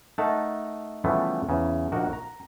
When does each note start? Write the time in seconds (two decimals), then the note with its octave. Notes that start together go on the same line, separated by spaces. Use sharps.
0.18 A3 D#4 A#4 F#5 A5 A#5
1.04 C#3 E3 F3 G3 A3 B3
1.49 E2 C#3
1.92 A#1 D4 D#4 F#4 A#4
2.13 A#5